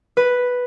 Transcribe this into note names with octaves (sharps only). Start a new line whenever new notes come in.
B4